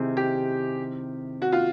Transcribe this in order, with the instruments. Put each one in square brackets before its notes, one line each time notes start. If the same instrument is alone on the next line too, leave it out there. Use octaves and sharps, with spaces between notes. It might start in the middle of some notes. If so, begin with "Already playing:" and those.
Already playing: [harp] C3 D#3 C4 E4 [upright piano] G#4
[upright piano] G4
F#4
F4